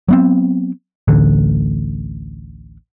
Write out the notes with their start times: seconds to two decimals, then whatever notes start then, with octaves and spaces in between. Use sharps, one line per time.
0.08 F#3 B3 C4
1.08 A1 D2 D3